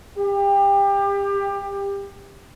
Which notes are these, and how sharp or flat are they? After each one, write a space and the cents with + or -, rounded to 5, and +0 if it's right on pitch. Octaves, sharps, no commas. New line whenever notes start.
G4 +25